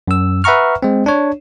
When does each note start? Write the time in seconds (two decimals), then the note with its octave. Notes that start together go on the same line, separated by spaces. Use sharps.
0.08 F#2 E6
0.44 B4 E5 F#5 A#5 C#6 F6
0.83 G#3 C4
1.06 D4 C#5